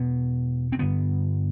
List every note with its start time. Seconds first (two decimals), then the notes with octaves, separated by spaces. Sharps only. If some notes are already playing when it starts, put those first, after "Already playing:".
Already playing: E2 B2 B3
0.72 C4
0.79 G2 D3 B3